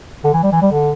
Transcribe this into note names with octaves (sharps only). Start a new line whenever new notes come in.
D3
E3
G3
E3
G3
D3